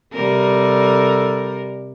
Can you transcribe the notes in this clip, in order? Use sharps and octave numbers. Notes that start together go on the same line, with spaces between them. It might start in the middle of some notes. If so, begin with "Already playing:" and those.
C3 G3 A4 A#4